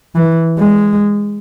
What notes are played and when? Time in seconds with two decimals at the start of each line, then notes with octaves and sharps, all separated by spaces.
0.15 E3
0.58 G#3